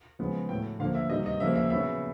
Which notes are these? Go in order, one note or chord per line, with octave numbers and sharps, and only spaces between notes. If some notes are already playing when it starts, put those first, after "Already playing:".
C#3 F3 G#3 B3
A2 F#3 A3 G5
D3 F3 A#3 F5
E5
C3 D#3 G3 D#5
D#5
C#3 F3 A#3 E5
E5
C#3 F#3 B3 E5